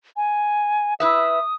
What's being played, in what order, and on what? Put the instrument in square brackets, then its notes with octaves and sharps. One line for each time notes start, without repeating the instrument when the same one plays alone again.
[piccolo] G#5
[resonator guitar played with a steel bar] E4 B4 E5 [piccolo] D#6